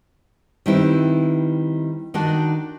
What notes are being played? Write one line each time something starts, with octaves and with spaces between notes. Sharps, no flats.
D#3 G3 B3 C4 E4
D#3 D4 D#4 F#4